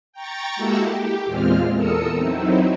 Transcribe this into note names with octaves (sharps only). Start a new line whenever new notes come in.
G5 A#5 C#6 A6
G#3 A#3 E4 F#4 G4 A4
G4
E2 A#2 G#3 C4 F4 F6
E2 A4 A#4 D#6 E6 C#7
F#3 C4 D#4 E4